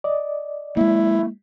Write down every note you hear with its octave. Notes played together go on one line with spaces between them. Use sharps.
D5 D#5
G#3 A#3 E4